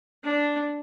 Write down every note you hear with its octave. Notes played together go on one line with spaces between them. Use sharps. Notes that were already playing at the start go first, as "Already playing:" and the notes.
D4